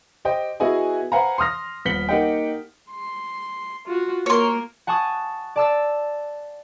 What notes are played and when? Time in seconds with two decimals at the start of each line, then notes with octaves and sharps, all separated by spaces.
0.25 G4 C5 D#5 G5
0.60 B3 E4 F#4 G#4 D#5 G#5
1.12 B4 C5 F5 F#5 G#5 A#5
1.38 C6 D#6 F6 A#6
1.85 D#1 B3 B6 C#7 F#7 G7
2.09 A#3 D#4 G4 D#5 F#5 G5
2.91 C6
3.86 F4 F#4
4.26 A#3 A#4 C#5 C6
4.87 F#5 G#5 A5 C#6 D#6
5.56 D5 A5 E6